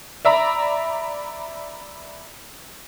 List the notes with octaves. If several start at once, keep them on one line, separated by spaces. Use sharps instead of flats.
D5 E5 A#5 B5